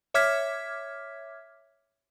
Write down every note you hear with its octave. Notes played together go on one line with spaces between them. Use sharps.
C#5 E5 D6 F6 G#6 B6